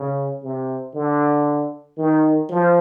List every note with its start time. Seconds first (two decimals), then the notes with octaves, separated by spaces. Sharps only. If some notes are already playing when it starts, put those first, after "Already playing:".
Already playing: C#3
0.43 C3
0.94 D3
1.97 D#3
2.49 F3